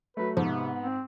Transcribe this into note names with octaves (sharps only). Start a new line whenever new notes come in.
F#3 A3 B4
G#2 C3 F3 B3
C4